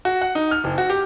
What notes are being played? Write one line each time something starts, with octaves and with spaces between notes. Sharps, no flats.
F#4
F#5
D#4
F6
F#1
F#4
G4